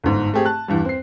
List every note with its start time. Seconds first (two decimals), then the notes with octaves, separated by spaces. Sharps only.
0.04 G1 G#2
0.34 A3 C4 G4 G#4
0.45 A5 F#6
0.68 E2 G2 G3
0.85 C4 C7